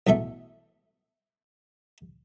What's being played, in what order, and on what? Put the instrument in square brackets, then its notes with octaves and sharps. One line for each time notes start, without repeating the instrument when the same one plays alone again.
[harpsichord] B1 E2 A3 E5